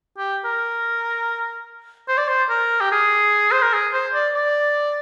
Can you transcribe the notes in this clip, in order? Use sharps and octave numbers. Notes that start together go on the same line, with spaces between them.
G4
A#4
C5
D5
C5
A#4
G4
G#4
C5
A#4
G#4
C5
D5
D5